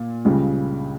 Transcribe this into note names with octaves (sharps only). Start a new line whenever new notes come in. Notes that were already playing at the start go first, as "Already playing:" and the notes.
Already playing: A#2
C#2 C#3 G3